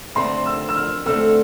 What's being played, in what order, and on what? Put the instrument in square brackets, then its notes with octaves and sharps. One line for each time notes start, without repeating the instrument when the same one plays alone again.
[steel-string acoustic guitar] D2 D3 A3 C4 [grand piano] C6
[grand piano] E6
E6
F6
[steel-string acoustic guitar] D2 D3 A3 C4 [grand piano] E6